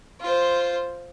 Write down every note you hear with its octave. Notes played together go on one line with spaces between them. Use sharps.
F4 C5